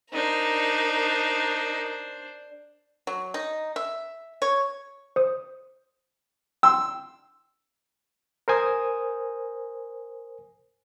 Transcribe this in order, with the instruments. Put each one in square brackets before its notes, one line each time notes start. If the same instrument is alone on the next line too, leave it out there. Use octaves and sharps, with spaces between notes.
[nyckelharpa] D4 C5 [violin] D#4 A#4
[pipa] F#3
D#4
E5
C#5
[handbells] C5 D#6
[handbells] G5 C6 [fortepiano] E6
[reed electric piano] A#4 C5 G#5 D#6